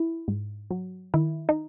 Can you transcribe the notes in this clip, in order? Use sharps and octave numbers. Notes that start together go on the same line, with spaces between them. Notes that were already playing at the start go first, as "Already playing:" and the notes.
Already playing: E4
G#2
F#3
D#3 E4
D#4